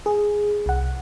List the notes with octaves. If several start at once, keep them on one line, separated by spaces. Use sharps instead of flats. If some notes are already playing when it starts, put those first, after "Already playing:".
G#4
C2 F#5